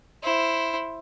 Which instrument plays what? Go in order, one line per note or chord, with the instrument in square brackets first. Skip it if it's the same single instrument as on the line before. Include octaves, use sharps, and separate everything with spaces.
[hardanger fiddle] E4 C5